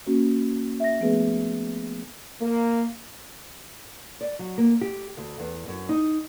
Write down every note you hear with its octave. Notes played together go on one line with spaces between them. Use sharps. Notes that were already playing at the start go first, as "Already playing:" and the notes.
A#3 C#4 F#4
E5 A#6
F3 A3 B3 G#4 B4
A#3
D5
F#3
A#3
G4
D2
E2
F#2
D#4